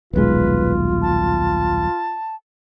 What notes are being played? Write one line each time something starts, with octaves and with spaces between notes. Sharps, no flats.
D#1 B1 G#3 F4 B4
A5